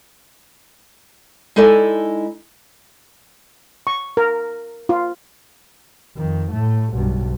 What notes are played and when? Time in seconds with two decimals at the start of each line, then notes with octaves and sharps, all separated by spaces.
1.56 G#3 D#4 E4 A4 D5 G#5
3.87 C#6
4.17 A#4
4.89 F4
6.16 F2 D#3
6.52 A2 A3
6.93 B1 G2